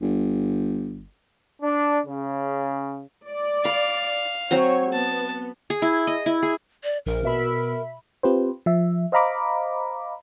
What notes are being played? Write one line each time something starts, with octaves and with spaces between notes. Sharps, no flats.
G1
D4
C#3
D5
F5 B5
F#3 C4 C5 C#5
B3 A5
G#4
E4
D#5
E4
G#4
D5
A#1 A#4
B2 E5 B5
C4 F4 G4 B4 C5
F3 E5
C5 D#5 F5 A#5 B5 D6